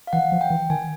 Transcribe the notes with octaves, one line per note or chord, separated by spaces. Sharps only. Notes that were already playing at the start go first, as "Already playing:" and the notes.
F5
E3 F#5
F3
G5
E3
D#3 G#5